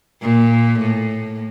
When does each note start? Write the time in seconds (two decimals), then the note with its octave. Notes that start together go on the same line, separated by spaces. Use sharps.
0.22 A#2
0.79 A2